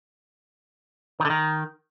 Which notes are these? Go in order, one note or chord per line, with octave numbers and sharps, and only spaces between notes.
D#3
D3
D#3